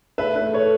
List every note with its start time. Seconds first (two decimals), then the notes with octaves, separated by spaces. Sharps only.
0.18 A3 B4 E5
0.36 B4
0.42 A3
0.53 A4 C#5